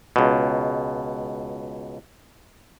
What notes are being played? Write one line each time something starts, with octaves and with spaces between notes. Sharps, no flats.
C#2 B2